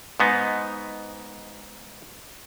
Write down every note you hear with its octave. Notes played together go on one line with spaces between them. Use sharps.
G#2 B3 D#4